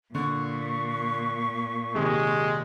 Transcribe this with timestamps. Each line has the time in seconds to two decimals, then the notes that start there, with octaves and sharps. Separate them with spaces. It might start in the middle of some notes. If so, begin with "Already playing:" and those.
0.15 A#2 D3 C#6
1.95 D#2 C3 D#3 G#3